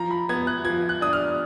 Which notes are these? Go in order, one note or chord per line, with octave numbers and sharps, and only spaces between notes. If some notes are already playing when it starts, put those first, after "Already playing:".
Already playing: F3 A#5
B5
B3 G#6
F#6
F3 G#6
F#6
D4 D#6
F6